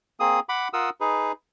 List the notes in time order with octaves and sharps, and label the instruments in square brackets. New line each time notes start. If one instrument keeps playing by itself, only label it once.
[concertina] A#3 C4 G#4 D#6
F#5 B5 D6
F4 A#4 F#5 D#6 E6
D#4 G#4 B4